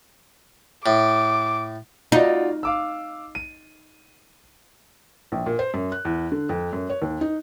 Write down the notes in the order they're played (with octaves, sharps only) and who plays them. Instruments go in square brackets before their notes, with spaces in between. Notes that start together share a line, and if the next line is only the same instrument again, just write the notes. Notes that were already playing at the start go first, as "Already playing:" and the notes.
[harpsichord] A2 [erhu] D6
[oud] D#4 [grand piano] F4 F#4 D5
[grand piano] F5 D6 E6
D#7
[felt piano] A#1
A#2
C5
F#2
F#6
E2
D3
F2
F#2
C#5
D#2
D#4